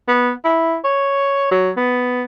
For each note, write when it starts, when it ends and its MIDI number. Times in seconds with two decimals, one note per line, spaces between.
0.08 0.31 59
0.45 0.76 64
0.84 1.47 73
1.51 1.71 54
1.77 2.24 59